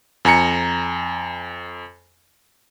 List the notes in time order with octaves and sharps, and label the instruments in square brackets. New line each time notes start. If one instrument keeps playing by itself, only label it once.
[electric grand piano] F2 G#5 A#5 C#7